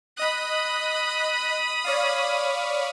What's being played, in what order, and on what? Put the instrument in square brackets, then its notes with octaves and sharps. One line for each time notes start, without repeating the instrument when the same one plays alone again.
[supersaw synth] D#5 F#6 [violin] B5 D#6
[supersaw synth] C#5 D5 F5